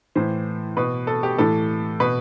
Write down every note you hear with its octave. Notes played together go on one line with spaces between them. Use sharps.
A2 E3 C5
B2 B4
A4
G4
A2 E3 A4
B2 B4